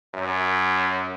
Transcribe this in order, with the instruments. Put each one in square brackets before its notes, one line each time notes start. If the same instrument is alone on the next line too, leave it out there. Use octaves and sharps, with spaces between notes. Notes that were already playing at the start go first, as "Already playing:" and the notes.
[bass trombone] F#2